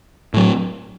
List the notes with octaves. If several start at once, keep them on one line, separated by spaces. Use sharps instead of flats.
A2 F#3